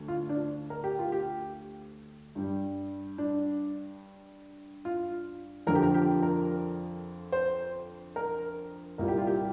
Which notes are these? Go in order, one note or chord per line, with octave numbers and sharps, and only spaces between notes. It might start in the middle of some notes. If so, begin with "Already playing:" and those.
Already playing: D2
F4
D4
A#4
G4
F4
G4
G2 G3
D4
F4
F2 D3 F3 A#4
G4
A#4
G4
A#4
C5
A#4
C2 A#2 G3 A#4
G4
F4
G4